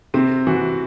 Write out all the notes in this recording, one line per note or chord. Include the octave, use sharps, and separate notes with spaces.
C3 C4
E3 F#4